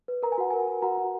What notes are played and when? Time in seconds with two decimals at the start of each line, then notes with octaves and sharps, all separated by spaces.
0.08 B4
0.23 A#4 A#5
0.32 G#5
0.38 F#4 F#5
0.50 A#4 G#5
0.68 A#4
0.82 F#4 F#5 A#5
0.97 F#4